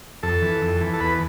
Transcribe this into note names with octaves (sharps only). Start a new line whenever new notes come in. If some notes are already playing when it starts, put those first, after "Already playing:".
F2 A4
E3
F2
E3
A4
E2 B4